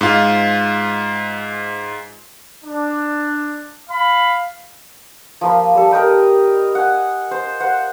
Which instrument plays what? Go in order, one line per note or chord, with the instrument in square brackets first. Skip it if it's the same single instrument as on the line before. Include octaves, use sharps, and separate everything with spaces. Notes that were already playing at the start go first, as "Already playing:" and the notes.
[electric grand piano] G#2 F4
[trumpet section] D4
F5 B5
[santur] F3 A#3 B5
G3 A4
A#4 D#5 G5 B5
F#5 G#5
C5
C5 F#5